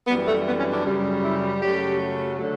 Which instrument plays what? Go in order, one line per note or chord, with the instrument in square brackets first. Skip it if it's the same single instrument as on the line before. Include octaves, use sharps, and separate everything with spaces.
[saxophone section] F#2 E3 G3 B3
A3
B3
C#4
D4
F#2 C#3 G3
E4
F#2 C#3 F#3 A3 G4
D3 F#3 A3